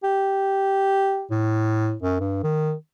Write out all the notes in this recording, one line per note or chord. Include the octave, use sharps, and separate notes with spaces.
G4
A2
F#2
G2
D#3